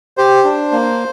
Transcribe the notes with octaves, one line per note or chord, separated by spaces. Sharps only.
G4 C5
D4
A#3